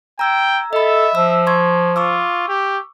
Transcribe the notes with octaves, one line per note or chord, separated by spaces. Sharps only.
G5 A#5 E6 G#6
A4 D#5 E5 B5
F3 E6
C6 C#6 G#6
F4 C#6 D6 E6
G4